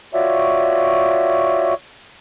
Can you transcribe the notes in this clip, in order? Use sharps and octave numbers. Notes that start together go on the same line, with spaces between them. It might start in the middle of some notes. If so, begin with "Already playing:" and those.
F4 F#4 C#5 D5 E5